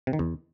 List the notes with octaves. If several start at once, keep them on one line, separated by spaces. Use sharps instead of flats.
C3
D#3
E2